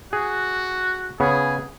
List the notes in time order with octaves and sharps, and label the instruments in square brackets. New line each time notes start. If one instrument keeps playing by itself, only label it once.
[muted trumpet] F#4 [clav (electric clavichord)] G#4
[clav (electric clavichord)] C#3 B3 [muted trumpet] G#4